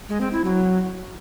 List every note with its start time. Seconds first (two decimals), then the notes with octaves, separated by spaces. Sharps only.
0.09 G#3
0.21 C4
0.33 E4
0.44 F#3